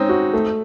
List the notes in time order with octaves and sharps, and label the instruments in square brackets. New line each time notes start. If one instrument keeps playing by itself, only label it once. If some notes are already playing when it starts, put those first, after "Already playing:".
Already playing: [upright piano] G#3 C#4 C#5 [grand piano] C4 D#4
[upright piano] F#4
A3